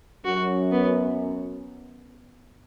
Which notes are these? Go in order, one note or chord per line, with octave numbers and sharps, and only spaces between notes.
F#2 F#4
B3